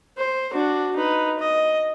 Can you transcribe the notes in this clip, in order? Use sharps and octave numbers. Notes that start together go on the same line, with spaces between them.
C5
D4 F#4
D#4 B4
D#5